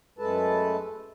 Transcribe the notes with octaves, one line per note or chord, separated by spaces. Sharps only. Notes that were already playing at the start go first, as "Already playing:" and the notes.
F#2 G#3 A3 A4 B4 A5